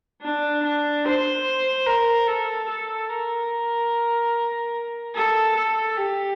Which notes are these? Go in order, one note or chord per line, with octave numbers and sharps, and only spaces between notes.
D4
D4
C5
A#4
A4
A4
A#4
A4
A4
G4